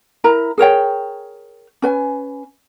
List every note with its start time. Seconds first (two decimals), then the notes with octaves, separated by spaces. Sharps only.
0.24 E4 A#4 A#5
0.58 G#4 A#4 C#5 G5
1.82 C#4 B4 G#5